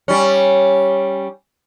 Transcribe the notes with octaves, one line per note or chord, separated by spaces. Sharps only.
G3 C#4